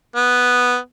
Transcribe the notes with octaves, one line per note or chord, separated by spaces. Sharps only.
B3